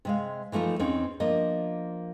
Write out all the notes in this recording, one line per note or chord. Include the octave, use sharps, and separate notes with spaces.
C3 G#3 F5
E3 F3 A3 D#4 F4
E2 C4 C#4 D#4
F3 A#3 D4 D#5